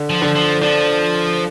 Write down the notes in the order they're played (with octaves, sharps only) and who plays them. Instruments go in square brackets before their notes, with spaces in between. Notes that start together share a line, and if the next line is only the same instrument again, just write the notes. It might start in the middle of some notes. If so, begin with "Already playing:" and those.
Already playing: [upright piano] D3
[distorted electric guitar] F3
[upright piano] D3
[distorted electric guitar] F3
[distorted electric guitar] F3 [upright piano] D4